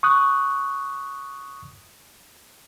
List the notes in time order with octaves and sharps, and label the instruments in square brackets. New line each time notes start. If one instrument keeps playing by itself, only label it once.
[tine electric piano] C#6 D#6 F#6